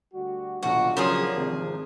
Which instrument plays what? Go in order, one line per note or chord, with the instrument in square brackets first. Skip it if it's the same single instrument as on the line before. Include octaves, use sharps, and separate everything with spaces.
[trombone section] D2 G3 F#4
[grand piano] D#1 B1 [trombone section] G3 D4 F4 [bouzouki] F#4
[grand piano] C#3 F#3 C6 [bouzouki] F3 A#3 G#4
[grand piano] G#1 C3